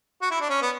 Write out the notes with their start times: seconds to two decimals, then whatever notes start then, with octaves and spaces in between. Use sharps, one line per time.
0.22 F#4
0.31 E4
0.40 D4
0.49 C#4
0.61 B3